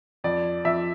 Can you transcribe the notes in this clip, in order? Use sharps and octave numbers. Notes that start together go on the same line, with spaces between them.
F2 D5
F2 E5